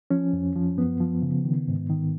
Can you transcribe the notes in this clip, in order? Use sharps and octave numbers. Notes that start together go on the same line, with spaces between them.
F3 C#4
F2
F3
F#2 B3
F3
C#3
D#3
G#2
D#3